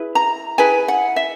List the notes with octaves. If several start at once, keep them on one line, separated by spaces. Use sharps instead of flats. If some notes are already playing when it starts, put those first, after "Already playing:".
Already playing: E4 G#4 B4
A#5
E4 G#4 B4 G#5
F#5
E5